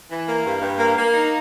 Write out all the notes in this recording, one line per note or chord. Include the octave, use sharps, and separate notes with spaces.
E3
A#3
G2
G2
A#3
A#3
D#4